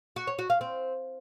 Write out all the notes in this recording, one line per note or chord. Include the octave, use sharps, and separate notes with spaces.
F#4
C#5
F#4
F5
C4